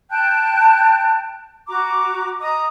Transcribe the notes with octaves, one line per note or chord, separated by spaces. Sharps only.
G5 A5 F#6 G6
F#4 A#5 D6
D#5 A#5 D#6